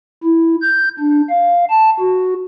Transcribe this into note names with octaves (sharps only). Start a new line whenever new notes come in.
E4
G6
D4
F5
A5
F#4